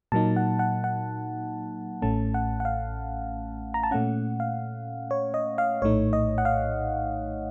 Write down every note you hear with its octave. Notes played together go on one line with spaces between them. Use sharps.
A#2 F#3 A#3 D#4 A5
F#5
F#5
F#5
A1 A2 A3 C#4 A5
F#5
F#5
F5
A#5
A5
A#2 A3 C#4 F#5
F5
C#5
D#5
F5
A#1 A2 A3 D#4 C#5
D#5
F#5
F5